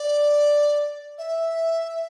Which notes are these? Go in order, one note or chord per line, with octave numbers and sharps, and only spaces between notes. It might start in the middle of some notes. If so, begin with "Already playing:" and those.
Already playing: D5
E5